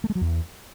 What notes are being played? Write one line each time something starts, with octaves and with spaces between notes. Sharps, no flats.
A3
G#3
F#3
E2